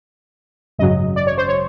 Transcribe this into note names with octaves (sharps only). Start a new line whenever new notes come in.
G#1 F#2 C#3 F#3 D#5
D5
C#5
C5
C#5